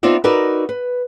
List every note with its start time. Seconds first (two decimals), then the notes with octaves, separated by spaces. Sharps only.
0.03 B3 C4 D#4 F4 D5 E5
0.24 D#4 F#4 A#4 B4 D5 E5
0.69 B4